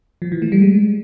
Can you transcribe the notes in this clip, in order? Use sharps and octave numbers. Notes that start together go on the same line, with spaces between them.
F3
E3
A3
G3
G#3